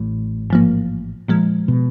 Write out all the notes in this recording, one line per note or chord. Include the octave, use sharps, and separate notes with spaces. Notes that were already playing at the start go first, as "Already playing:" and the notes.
Already playing: A1 A2
G#2 F3 A#3
A#2 F3 G#3
B2